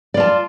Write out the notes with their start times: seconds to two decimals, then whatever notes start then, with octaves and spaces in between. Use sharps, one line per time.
0.14 D5
0.17 F4
0.20 A5